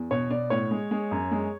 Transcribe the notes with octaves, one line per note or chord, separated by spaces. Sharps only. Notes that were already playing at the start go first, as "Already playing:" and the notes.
Already playing: E2
B2 C#5
B2 D5
A2 C#5
G#3
G#3
F#2
G#3